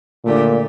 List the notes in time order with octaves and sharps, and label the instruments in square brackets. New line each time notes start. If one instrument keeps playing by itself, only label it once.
[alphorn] A#2 [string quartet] D3 A3 D4 G4